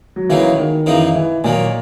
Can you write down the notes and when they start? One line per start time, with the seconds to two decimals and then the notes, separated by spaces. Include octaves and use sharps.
0.16 F#3
0.29 C#3 E3 F#3 A#3 D#4
0.58 D#3
0.86 F#2 C#3 E3 A#3 D#4
1.16 E3
1.44 A#2 D#3 F#3 A#3